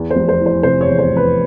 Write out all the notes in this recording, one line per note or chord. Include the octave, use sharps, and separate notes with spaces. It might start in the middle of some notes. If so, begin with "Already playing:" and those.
Already playing: E2
C5
F1
C5
E3
C5
C3 C5
C#5
E2
C5
F1
B4